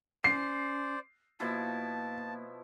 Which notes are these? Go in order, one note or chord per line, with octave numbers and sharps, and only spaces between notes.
C#4 C5 D5 C7
B2 F3 A#3 E4 A5